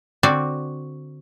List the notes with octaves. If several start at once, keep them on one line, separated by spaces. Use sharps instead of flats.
D3 C4 F#4 D5